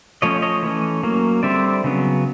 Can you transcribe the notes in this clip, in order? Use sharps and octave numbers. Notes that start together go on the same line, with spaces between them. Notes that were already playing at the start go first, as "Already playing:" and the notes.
F3 A3 C#4 C#5 D#5
C#5 D#5
E3 A3 C#4
F#3 A#3 C#4
D3 G3 C4 D5 E5
C#3 F#3 B3